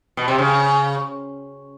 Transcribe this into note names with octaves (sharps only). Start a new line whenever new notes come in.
B2
C3
C#3